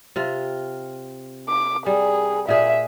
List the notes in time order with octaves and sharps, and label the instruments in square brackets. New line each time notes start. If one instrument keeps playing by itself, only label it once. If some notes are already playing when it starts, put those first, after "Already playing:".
[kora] C3 F4
[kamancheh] D6
[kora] G3 [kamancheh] G#4
[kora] A#2 G#4 [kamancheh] E5